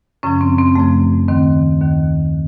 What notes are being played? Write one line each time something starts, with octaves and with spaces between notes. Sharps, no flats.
F#2 C#3 F3 C#4
C4
C4
F#2 C#3 F3 A3
D#2 D#3 C4
D#2 D#3